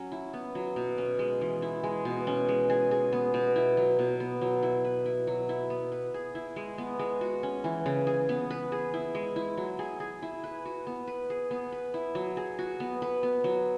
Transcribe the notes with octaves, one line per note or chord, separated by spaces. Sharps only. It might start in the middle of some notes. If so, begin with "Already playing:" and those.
Already playing: F#3 C#4
E4
B3
F#3
B2
C#4
G#3
E3
E4
G#3
B2
C#4
G#3
G#4
G#4
B3
B2
E4
F#3
B2
B3
F#3
E4
B4
E4
F#3
E4
B3
B4
G#4
E4
G#3
B3
G#3
F#4
C#4
E3
C#3
G#4
B3
B4
G#4
E4
G#3
E4
F#3
G#4
G#4
E4
B4
F#4
B3
B4
G#4
B3
B4
E4
F#3
G#4
F#4
B3
B4
B3
F#3